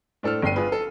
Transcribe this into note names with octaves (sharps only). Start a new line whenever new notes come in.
A2 D4 A4 C5 F6
G1 D4 G5 C7 D#7
F4 G#4 B4
A4